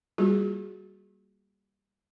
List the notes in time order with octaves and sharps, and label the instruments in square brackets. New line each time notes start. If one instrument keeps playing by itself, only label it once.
[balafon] G3 A#3 F4 F#4 G#4